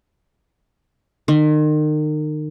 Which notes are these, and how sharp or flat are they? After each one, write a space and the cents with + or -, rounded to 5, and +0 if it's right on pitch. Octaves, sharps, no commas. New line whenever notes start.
D#3 -35